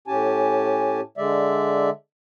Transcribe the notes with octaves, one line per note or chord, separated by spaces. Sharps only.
A2 C#4 G4 G#5 A5
D3 G#3 D5 E5